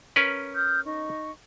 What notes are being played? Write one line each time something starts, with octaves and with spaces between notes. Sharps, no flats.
C#4 A#4 B4
D#6 F6 G6
D#4 D#5 C#6